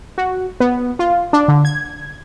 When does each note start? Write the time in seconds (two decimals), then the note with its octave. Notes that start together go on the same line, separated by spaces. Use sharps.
0.18 F#4
0.60 B3
0.99 F4
1.33 D4
1.48 D3
1.65 G#6